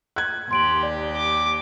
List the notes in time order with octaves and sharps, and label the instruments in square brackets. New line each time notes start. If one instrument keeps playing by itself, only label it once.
[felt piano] F#6 G#6
[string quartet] D#2 G4 [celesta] C6 D7 F#7
[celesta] D5
[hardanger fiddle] D6